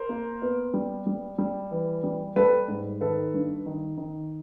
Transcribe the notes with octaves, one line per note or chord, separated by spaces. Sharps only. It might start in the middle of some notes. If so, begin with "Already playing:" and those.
Already playing: A#4 C5
A#3
B3
G3
G3
G3
E3
G3
G3 A4 B4
G#2
D#3 A4 B4
G2
D#3
D#3